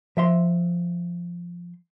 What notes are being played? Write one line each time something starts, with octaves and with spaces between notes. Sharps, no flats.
F3 E5 C6